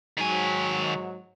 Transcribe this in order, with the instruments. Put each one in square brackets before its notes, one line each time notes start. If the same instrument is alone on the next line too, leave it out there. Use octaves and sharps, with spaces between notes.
[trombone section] G#2 F#3 [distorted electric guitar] D#3 G#5